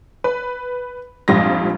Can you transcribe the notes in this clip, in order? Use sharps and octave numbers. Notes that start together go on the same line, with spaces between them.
B4
A#1 F2 G#2 G3 F4 A#6